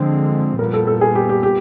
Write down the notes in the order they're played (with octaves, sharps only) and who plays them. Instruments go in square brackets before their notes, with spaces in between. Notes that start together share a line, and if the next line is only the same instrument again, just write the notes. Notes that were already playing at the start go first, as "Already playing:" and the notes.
Already playing: [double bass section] D3 F3 G#3 C4
[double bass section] A#2 G3 B3 [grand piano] A#4
[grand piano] A4
A4
G#4
G4
G4
G4